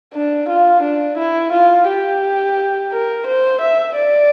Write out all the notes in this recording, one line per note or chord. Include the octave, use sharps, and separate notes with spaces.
D4
F4
D4
E4
F4
G4
A#4
C5
E5
D5